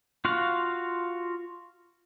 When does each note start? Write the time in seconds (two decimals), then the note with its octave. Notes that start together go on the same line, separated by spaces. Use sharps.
0.25 F4 F#4 F5